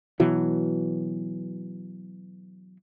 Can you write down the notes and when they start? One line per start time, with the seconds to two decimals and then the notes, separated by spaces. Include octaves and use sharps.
0.20 B2 E3 F#3